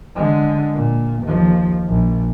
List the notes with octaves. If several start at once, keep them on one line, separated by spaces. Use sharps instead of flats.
D3 G#3
A#2
D#2 F3
A#1